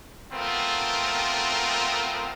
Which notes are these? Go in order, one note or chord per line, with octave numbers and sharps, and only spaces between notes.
A3 B3 C4 F4 A#4